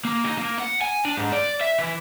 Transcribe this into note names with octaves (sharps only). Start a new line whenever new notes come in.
A#3
D#4
A#3
F#5
G#5
D4
G#2
D5
E5
E3